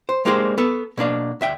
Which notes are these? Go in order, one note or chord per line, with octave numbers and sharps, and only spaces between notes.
C5
G#3 A#3 D4 G4 G#4 C5
B3 A4
B2 A#3 D4 F5
D2 E5 G5